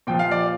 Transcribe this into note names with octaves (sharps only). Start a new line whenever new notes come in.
A#2 F3 G5
F5
D5